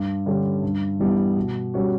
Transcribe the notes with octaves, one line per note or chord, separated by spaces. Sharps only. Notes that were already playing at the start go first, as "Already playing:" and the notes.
Already playing: G2
D3 G3 C#4 G4
G2
E3 G3 B3
B2
G3 C#4 F#4